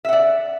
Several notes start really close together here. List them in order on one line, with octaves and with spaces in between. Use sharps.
E5 F#5 D5